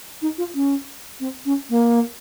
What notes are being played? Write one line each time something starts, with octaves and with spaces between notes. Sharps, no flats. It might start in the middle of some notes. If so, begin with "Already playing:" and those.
D#4
F4
C#4
C4
C#4
A#3